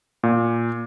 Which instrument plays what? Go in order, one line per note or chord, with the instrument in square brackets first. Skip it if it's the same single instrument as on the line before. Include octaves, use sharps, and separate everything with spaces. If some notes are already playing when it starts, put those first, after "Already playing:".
[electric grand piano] A#2